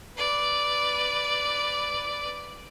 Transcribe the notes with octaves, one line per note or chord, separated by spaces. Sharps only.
B4 D5